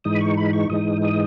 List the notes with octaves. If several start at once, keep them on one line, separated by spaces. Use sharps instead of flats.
G#2 E3 G#3 D#4 D#6
B5
C#6
B5
C#6
G#2 E3 G#3 D#4 D#6
D#6